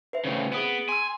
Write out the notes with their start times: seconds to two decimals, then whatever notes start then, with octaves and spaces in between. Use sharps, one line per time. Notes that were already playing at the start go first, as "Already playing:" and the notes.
0.13 B4 C5 E5
0.25 A2 C#3
0.53 B3 G#4 D#6 D7
0.89 G#5 C6 E6